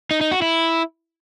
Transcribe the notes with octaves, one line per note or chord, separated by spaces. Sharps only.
D#4
D#4
F#4
E4